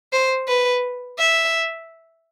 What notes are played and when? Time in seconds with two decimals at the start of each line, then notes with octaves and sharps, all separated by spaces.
0.12 C5
0.48 B4
1.19 E5